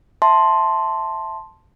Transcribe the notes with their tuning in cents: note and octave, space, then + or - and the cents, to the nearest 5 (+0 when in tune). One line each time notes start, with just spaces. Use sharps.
E5 +0 A5 +0 C6 +5